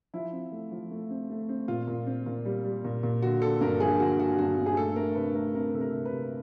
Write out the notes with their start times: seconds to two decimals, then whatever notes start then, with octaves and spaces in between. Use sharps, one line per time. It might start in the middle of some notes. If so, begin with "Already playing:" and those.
0.14 F3 E4
0.33 C4
0.52 A3
0.72 F3
0.91 A3
1.10 C4
1.30 A3
1.49 C4
1.68 A#2 F4
1.88 A#2
2.06 C4
2.26 A#2
2.45 G3
2.65 G3
2.84 A#2
3.03 A#2
3.22 D3 F#4
3.41 D3 A4
3.61 G2 A#4
3.80 F3 G#4
4.00 D3 F#4
4.19 D3 F#4
4.39 G2 F#4
4.58 G2
4.66 G#4
4.77 A3 A4
4.96 A3 A#4
5.15 C3 B4
5.35 A3 A#4
5.54 C4 A#4
5.74 C3 A4
5.81 A#4
5.93 C3
6.06 B4
6.12 C3